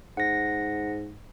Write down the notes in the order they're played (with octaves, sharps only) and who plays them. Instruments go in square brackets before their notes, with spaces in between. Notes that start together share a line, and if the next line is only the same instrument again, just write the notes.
[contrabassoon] G#2 [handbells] F#5 A#6